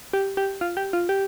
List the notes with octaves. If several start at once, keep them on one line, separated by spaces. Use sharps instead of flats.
G4
G4
F4
G4
F4
G4